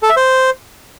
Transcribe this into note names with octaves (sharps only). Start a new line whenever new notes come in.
A4
E5
C5